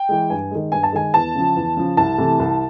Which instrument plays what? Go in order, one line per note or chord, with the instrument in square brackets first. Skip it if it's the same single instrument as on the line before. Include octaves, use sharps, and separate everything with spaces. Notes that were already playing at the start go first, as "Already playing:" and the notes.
Already playing: [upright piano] G5
E3 G#3
G2 G#5
D#3 G#3
G2 G#5
A5
D#3 G#3 G#5
E2 A5
C#3 F3
E2
C#3 F3
C2 A5
C3 E3 A3
C2